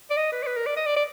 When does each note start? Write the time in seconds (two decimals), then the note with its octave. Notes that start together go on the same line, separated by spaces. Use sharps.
0.10 D5
0.17 D#5
0.32 B4
0.43 D5
0.47 B4
0.56 A#4
0.66 D5
0.77 D#5
0.86 D5
0.96 D5